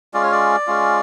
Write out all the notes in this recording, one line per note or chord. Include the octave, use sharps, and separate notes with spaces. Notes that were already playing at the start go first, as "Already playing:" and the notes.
G#3 C#4 F4 D5
C#5
D5
G#3 C#4 F4